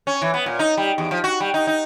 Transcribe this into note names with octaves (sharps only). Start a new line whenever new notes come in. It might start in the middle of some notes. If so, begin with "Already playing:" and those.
C#4
E3
B3
A#2
D#4
G3
E2
F3
F#4
G3
D#4
D#4